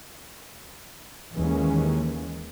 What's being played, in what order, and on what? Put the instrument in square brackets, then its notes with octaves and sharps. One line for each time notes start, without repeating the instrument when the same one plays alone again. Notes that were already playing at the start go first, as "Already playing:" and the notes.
[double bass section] D#2 D#3 E3 G#3 A#3 C#4